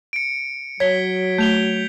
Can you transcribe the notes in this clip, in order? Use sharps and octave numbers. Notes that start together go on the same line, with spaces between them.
C#7 D7
F#3 C#5 G#6 B6 G7
A3 G6 F7 G7